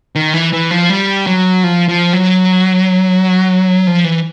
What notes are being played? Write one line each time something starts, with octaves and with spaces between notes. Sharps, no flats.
D#3
E3
E3
F3
G3
F#3
F3
F3
F#3
F3
E3